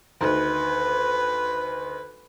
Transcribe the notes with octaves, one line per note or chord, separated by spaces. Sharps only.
D2 D#3 B4